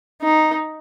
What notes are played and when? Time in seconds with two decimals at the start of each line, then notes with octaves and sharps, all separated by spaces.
0.22 D#4